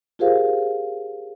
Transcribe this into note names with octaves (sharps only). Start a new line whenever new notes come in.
F4 G4 G#4 A#4 C5 F5